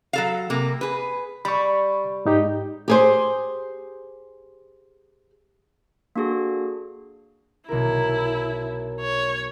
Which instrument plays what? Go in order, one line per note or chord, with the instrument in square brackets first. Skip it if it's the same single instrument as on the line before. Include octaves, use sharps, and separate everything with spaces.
[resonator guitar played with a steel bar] F#3 A4 F5
C3 A#3
G#4 B4
[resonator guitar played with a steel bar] G3 [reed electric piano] B5 C#6
[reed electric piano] G#2 D#4 G4
[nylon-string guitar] G4 G#4 C5
[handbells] A#3 D4 F#4 G#4 A4
[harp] B1 A#4 [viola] E4
[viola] C#5